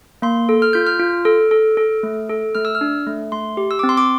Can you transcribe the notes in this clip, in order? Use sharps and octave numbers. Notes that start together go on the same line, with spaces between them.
A#3 C6
A4
F6
F4 G6
F6
F4
A4
A4
A4
A3
A4
A3 F6
E6
F6
D4
A3
A3 C6
G4
E6
D6
C4
C6
D6